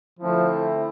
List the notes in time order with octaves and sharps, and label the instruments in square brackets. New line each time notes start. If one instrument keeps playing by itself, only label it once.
[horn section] D3 A3 C4 E4 [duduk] F3